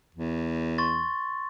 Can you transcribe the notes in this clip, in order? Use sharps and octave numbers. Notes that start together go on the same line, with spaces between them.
E2
C6 C#6 A6